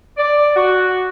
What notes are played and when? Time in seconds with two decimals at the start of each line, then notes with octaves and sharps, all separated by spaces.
0.17 D5
0.55 F#4